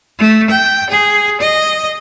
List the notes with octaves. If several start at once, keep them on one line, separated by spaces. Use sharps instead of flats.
A3
G5
G#4
D#5